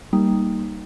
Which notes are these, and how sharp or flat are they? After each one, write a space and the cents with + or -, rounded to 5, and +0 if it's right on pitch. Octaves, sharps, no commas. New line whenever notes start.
G3 +0 A#3 +0 D#4 +0